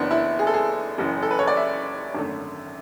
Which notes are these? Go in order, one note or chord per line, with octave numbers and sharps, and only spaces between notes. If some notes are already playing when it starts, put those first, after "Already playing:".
Already playing: F#1 F#2 E3 B3 D4
E4
G#4
A4
G#4
F#1 F#2 E3
A4
B4
C#5
D5
E5
G#1 F#2 D3 A3